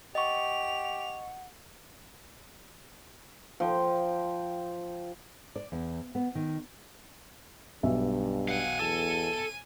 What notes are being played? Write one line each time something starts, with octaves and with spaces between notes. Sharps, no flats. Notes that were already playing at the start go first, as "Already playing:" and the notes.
G4 D#5 F#5 C#6 F7
F3 G5
D5
E2
B3
D#3
B1 G2 E5
F5 F#5 G#5 D#7
E2 A4